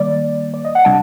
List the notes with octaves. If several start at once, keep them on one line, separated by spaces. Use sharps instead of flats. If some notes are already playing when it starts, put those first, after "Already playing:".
Already playing: D#3 G3 A#3 D5
D5
D#5
F#5
C3 G3 D4 A5